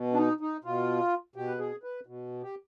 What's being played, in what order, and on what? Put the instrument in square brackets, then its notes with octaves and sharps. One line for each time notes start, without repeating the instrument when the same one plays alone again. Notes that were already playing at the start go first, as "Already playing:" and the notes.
Already playing: [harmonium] B2
D4
D#4
D#4
B2 F4
B2 G4
B4
G#4
B4
B2
G4